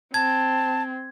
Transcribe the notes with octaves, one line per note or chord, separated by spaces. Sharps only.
C4 A5 G#6